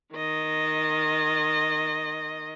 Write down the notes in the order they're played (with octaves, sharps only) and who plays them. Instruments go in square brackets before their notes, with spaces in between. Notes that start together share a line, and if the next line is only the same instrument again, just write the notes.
[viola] D#3 D#5